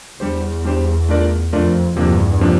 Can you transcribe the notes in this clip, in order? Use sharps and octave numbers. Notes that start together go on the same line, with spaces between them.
E2 G3 D4 G4 C5
G3 D4 G4 C5
A3 D4 F4 A#4 D5
F2 A3 D4 F4 A#4 D5
E2 G2 C3 F3 A#3 D4
C3 F3 A#3 D4